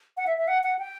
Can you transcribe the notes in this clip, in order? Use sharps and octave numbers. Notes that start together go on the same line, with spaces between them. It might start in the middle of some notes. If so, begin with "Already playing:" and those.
F#5
E5
E5
F#5
F#5
G5